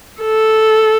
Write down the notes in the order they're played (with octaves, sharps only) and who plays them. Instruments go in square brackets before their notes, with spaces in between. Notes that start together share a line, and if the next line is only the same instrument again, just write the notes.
[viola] A4